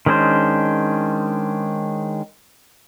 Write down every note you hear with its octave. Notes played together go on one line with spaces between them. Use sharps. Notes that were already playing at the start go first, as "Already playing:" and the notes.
D#3 G#3 C#4 D4 C5